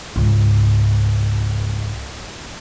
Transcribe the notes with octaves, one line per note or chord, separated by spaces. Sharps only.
C#2 G#2